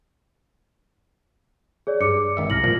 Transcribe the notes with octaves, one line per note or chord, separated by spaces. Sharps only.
G#4 C#5 D5
G2 D6 C#7
G#1 D#3 E5
C2 F6 A#6 F#7
A#2 F3